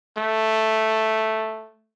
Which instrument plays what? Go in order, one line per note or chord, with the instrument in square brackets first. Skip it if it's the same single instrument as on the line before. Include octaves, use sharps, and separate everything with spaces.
[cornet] A3